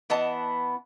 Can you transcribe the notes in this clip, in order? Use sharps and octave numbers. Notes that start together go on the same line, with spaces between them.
E3 B3 D#5 A5